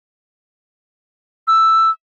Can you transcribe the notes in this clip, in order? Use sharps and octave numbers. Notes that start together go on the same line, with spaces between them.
E6